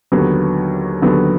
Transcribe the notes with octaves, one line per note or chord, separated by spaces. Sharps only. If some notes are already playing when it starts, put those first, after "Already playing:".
D#2 D3 F#3 B3
D#2 D3 F#3 B3